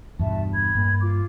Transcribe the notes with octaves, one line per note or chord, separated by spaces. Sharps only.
E2 G2 B2 E5 A5
B5 G#6
G2 A#3
F4 D6